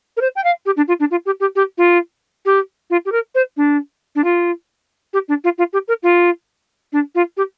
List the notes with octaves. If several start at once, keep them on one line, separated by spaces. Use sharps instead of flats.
A#4
C5
G5
F5
G4
D4
F4
D4
F4
G4
G4
G4
F4
G4
F4
G4
A#4
C5
D4
D4
F4
G4
D4
F4
F4
G4
A#4
F4
D4
F4
G4